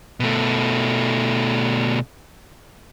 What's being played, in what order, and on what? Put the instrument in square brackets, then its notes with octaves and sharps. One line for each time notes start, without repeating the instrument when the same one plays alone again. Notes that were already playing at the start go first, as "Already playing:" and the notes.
[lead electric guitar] B2 A3